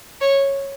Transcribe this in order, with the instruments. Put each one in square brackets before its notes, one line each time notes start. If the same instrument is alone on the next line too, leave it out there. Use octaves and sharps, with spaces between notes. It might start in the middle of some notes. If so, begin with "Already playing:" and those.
[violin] C#5